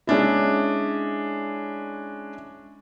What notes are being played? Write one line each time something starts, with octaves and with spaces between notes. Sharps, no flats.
G#3 C#4 D4 E4